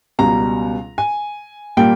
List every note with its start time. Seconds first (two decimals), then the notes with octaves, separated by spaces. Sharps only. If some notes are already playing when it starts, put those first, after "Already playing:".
0.19 C#2 B2 G3 A#5
0.98 G#5
1.77 A#2 G3 A#3 G5